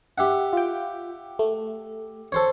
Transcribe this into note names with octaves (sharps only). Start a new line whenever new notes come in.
G4 E5 F#5
F4 G5
A3
A4 C5 C#5